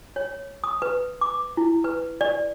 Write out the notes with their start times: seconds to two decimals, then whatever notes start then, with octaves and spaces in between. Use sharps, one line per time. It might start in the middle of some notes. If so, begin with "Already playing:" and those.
0.16 C#5
0.64 D#6
0.82 B4
1.21 D6
1.57 E4
1.84 B4
2.21 D5